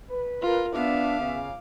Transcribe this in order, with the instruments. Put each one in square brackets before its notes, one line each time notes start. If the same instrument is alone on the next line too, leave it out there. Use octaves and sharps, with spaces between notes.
[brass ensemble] B4
[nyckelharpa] F4 A#4
[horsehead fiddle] B3 E5 [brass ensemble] D4 [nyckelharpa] F5 D6
[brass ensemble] C#3